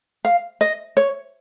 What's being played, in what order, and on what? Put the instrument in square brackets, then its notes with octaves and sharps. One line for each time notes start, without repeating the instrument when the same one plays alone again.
[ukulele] F5
D#5
C#5